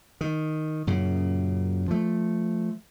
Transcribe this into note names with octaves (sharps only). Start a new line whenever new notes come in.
D#3
F#2 A#2 C#3
F3 A3